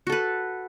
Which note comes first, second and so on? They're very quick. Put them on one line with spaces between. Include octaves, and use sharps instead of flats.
F#4 A4 B4